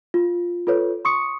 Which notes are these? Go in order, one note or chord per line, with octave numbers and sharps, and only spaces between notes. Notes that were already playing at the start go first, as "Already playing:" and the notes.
F4
F4 A4 B4 C#5
C6 C#6 D#6 C#7